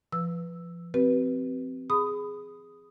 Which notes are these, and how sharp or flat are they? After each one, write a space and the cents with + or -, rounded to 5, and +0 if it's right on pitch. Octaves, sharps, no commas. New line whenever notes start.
F3 -25 B4 +0 E6 +0
C4 -15 G4 -45 B4 -15
G#4 +0 B5 +25 D#6 +0